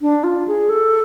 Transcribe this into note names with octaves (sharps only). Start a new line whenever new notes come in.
D4
F4
G#4
A4